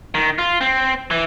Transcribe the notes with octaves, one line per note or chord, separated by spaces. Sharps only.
D#3
F4
C4
E3